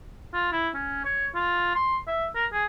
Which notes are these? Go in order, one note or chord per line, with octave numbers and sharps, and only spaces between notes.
F4
E4
C#4
C#5
F4
C6
E5
A#4
G#4